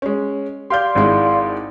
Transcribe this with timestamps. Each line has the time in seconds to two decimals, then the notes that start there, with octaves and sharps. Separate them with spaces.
0.02 G#3 C#4
0.70 G4 D5 F5 C6 G6
0.95 G#1 G#3 E4